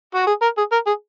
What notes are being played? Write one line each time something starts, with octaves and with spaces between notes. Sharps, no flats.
F#4
G#4
A#4
G#4
A#4
G#4